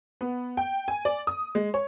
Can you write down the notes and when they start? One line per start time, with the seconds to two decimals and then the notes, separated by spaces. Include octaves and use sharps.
0.21 B3
0.57 G5
0.88 G#5
1.05 D5
1.27 D#6
1.55 G#3
1.74 C#5